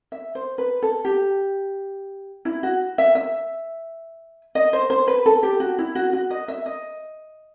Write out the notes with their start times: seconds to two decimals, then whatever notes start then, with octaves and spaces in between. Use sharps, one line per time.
0.12 E5
0.35 C5
0.58 B4
0.82 A4
1.05 G4
2.45 E4
2.63 F#4
2.98 E5
3.15 E5
4.55 D#5
4.73 C5
4.90 C5
5.08 B4
5.26 A4
5.43 G4
5.60 F#4
5.79 E4
5.95 F#4
6.13 F#4
6.30 D#5
6.48 E5
6.66 D#5